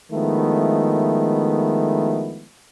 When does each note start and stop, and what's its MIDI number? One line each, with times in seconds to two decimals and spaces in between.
0.12 2.46 51
0.12 2.46 53
0.12 2.46 56
0.12 2.46 57
0.12 2.46 59
0.12 2.46 64